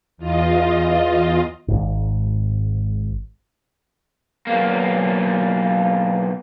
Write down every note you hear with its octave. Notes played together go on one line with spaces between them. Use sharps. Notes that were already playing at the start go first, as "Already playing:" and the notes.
E2 F4 D#5
G#1 G#2
B1 A#3